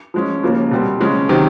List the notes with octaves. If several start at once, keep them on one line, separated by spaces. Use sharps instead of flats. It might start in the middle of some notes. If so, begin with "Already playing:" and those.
F3 G#3 C#4
D#2 C#3 F3 A#3
B2 G3 C4
C#3 F3 G#3 C#4
C3 D#3 F#3